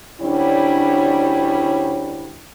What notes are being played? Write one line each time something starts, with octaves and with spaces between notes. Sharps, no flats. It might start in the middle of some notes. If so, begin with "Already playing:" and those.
D2 F#3 G3 C#4 D4 E4